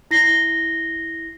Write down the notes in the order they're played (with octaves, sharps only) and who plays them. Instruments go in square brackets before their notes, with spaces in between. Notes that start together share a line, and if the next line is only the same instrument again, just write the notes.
[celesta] E4 A#6 C7 G7